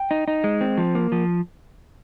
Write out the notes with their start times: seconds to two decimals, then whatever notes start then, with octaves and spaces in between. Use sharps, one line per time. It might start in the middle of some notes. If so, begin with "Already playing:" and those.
Already playing: G5
0.11 D#4
0.28 D#4
0.44 G#3
0.61 C4
0.78 F3
0.95 A#3
1.12 F3